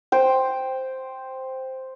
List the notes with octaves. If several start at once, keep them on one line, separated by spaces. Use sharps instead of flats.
C5 G5